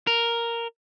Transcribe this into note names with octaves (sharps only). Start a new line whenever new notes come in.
A#4